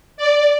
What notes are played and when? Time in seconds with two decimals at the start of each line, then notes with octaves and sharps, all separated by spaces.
0.17 D5